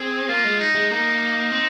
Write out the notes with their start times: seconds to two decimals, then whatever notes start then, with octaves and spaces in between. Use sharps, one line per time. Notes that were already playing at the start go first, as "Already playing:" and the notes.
Already playing: C4 G#4
0.29 A#3 F4
0.44 G#3
0.60 D#4
0.75 G#3
0.90 A#3 D#4
1.52 C4